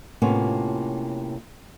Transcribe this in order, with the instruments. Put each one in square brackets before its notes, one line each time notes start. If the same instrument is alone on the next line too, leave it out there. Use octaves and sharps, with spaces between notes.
[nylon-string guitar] A2 C3 A#3 B3 C#4 F4